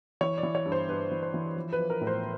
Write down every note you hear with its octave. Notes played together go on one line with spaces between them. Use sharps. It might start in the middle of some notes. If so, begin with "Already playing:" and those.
E3 C#5
D5
E3
C#5
G2
C5
G2 B4
E3
C5
E3
F3
B4
F3
A#4
A2
C5